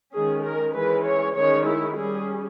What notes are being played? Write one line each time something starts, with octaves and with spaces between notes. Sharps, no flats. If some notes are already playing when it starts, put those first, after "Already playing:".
D#3 G#3 C#4 G#4
A#4
E3 G#3 C#4 B4
C#5
D#3 G#3 C#4 C#5
E4
G3 C#4 G#4